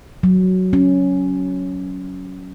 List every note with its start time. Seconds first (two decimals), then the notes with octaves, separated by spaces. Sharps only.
0.23 F#3
0.73 C#4